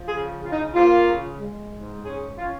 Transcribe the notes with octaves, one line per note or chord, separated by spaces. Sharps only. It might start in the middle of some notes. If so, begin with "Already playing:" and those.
Already playing: F3
C#3 G#4
C#3 F4
D#4
A#3 F4
C#3
G#3
G#2
C#4 G#4
C#4 F4